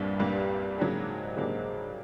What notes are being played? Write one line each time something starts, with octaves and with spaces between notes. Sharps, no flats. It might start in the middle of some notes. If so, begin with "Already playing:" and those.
Already playing: C2 G2 A#2 G3 A#3 D4
C2 A#2 G3 A#3 D4
G#2 C#3 F#3 A#3 D4 G4
C#3 F#3 A#3 D4 G4